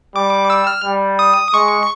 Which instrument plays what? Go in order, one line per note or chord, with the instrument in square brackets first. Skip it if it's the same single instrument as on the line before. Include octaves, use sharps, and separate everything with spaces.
[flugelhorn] G3 [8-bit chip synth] D6
[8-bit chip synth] E6
F6
[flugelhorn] G3
[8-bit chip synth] D#6
[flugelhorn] G#3 [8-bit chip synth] C#6